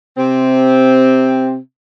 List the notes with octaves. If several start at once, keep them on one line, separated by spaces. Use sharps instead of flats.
C3 C4